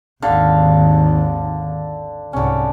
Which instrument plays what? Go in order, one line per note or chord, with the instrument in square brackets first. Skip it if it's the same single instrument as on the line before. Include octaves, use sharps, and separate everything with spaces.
[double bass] G#1 D#2 [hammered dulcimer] D3 F5
[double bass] C2 G#2 [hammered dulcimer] D3 C#4